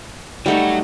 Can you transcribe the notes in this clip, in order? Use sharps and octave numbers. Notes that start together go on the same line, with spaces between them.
F#3 G3 A3 D#4 F#5